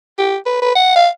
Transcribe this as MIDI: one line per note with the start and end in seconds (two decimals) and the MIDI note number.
0.19 0.36 67
0.46 0.60 71
0.62 0.75 71
0.75 0.94 78
0.96 1.09 77